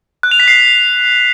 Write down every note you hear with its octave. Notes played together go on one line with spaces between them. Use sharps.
F#6
F7
B6
C7